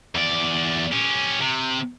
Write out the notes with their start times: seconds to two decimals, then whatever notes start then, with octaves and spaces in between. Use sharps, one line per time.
0.15 E2 D5
0.93 C#4 G4
1.42 C3